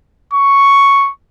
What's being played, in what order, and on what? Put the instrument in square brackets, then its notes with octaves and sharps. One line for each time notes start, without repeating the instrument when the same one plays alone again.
[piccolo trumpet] C#6